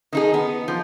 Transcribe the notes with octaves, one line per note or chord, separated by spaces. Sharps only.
D#3 D#4 G#4
B3
F3